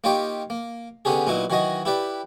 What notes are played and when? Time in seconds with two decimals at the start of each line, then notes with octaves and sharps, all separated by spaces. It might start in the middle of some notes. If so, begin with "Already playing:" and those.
0.04 A#3 D#4 F4 G4 C#5 G5
0.50 A#3
1.05 D3 B3 C#4 G4 G#4
1.27 A#2 F#3 B3 D#4 E4 F#4
1.50 D#3 E3 F#3 F#4 D#5
1.85 E4 G4 B4 D5